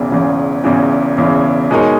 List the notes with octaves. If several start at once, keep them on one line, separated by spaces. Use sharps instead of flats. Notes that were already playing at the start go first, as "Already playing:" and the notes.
Already playing: E1 E2 C#3 E3
E1 E2 C#3 E3
E1 E2 C#3 E3
E1 E2 C#3 E3
B2 G#3 D#4 A#4 C#5